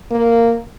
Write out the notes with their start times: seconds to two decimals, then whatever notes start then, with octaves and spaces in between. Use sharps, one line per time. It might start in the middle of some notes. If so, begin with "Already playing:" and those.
0.11 A#3